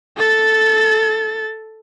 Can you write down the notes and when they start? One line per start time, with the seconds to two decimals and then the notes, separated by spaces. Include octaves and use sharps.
0.17 A4 A6